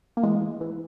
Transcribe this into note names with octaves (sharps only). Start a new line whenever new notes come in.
A#3
E3 G#3
E3
E3